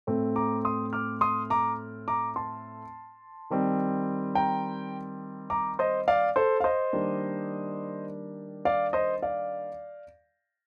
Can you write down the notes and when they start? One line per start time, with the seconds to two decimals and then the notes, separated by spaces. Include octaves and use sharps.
0.07 A2 A3 C4
0.36 A#5 D6
0.65 C6 D#6
0.93 D6 F6
1.21 C6 D#6
1.50 A#5 D6
2.08 A#5 D6
2.36 A5 C6
3.50 D#3 G3 C4
4.35 G5 A#5
5.50 A#5 D6
5.79 C5 D#5
6.08 D5 F5
6.36 A4 C5
6.60 F5
6.64 C5 D#5
6.93 D#3 G3 A#3 D4
8.65 D5 F5
8.93 C5 D#5
9.22 D5 F5